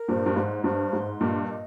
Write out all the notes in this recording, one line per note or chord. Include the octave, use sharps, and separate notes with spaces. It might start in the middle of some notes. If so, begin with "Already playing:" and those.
Already playing: A#4
G2 A#2 C5
G2
G#2 C5
G2 C5
G#2 C6
G2 A#2 D#5
D#5